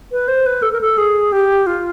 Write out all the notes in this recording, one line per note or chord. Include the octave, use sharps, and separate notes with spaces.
B4
C5
B4
A4
A#4
A4
G#4
G4
F4